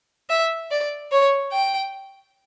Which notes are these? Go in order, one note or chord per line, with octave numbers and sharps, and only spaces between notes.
E5
D5
C#5
G5